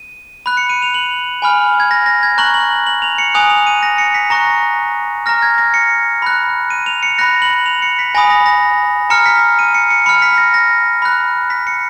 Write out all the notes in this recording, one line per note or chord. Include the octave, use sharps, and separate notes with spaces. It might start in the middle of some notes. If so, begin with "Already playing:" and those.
Already playing: D#7
B5 F#6
C#7
D#7
F7
F#7
G#5 B5 F6
G#6
A#6
A#6
G#6
A#5 C#6 F#6 F#7
F#7
F#7
F7
C#7
G#5 D#6 F#6 F7
F7
D#7
A#6
C#7
B6
A#5 C#6 F#6 A#6
A#5 F6 A#6
G#6
A#6
C#7
B5 F#6
D#7
F7
C#7
B5 F#6 A#6
F#7
F7
C#7
B6
G#5 B5 D#6 A#6
A#6
A#6
A#5 F6 C#7
B6
D#7
C#7
C#7
B5 F6 C#7
B6
A#6
A#6
B5 F#6
B6
C#7